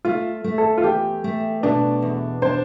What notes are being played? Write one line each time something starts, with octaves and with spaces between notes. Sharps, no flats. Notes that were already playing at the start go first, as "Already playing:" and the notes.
A3 F4
A3
A4
F4
E2 G4
A3
B2 D4
E2
D4 C5